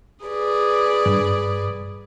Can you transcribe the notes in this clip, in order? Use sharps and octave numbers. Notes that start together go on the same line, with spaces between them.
G#4 B4 D5
G2